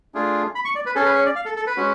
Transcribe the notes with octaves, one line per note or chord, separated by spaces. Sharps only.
A3 D4 F4 G#4
B5
C#6
D5
B4
C#4 G#4 A4
B4
C#5
D5
F5
A4
A4
B4
G#3 C#4 F#4